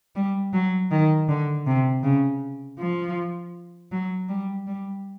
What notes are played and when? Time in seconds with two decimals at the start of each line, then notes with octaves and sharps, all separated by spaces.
0.16 G3
0.53 F#3
0.91 D#3
1.29 D3
1.67 C3
2.03 C#3
2.79 F3
3.92 F#3
4.29 G3
4.67 G3